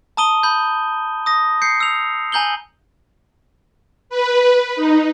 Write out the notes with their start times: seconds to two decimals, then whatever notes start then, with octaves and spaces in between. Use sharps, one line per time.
0.17 A5 A#5 D#6 D#7 G7
0.43 B5 G6
1.26 D#6 A#6
1.62 G6 C7 C#7
1.80 E6 F7
2.32 G#5 A#5 G6 F#7 G7
4.10 B4
4.76 D#4